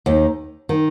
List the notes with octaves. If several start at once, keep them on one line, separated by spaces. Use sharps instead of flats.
D#2 D#3
D#3